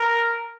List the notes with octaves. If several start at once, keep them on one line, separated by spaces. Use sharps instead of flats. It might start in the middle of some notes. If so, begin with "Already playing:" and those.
Already playing: A#4